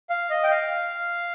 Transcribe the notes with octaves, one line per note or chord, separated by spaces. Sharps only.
F5
D#5
G5
F5